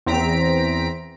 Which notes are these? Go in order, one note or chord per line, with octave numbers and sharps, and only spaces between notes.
E2 C4 A#5 B6 D7